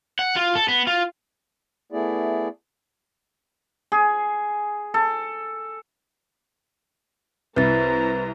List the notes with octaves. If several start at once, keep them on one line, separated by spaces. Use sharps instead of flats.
F#5
F4
A4
B3
F4
A3 B3 E4 G#4 D5
G#4
A4
C2 E4 B4 C5 A#5 A6